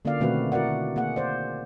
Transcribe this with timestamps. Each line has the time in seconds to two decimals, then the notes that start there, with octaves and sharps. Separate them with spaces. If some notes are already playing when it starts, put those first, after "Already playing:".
0.05 D3 A#3 C#4 F4 D5 F5
0.20 B2 D#3 A3 C4 F#4 B4
0.52 E4 F#4 A#4 D5 F#5
0.69 D3
0.96 A#3 G#4 F#5
1.16 C5 D5